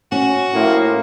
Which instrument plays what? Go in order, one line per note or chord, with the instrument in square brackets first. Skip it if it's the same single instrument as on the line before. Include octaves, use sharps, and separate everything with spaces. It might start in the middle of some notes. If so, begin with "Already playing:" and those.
[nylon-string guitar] C#4 [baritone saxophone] F#4
[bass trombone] A2 [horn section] F3 A#3